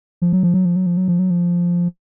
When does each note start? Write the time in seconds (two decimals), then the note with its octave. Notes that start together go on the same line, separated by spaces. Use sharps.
0.22 F3
0.33 F#3
0.43 F3
0.54 F#3
0.65 F3
0.76 F#3
0.86 F3
0.97 F#3
1.08 F3
1.19 F#3
1.30 F3